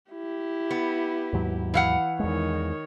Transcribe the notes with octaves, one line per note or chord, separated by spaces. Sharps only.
E4 G4
B3
D#2 G#2 F#3
E3 F5 F#5
E2 D#3 G#3 C#5